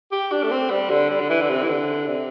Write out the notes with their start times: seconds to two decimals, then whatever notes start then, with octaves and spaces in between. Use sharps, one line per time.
0.12 G4
0.32 D4
0.44 A3
0.51 C4
0.70 G3
0.90 D3
1.10 G3
1.21 D3
1.30 E3
1.41 D3
1.50 C3
1.63 E3
1.69 D3
2.08 C3